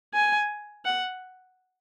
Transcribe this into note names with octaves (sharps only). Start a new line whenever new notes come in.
G#5
F#5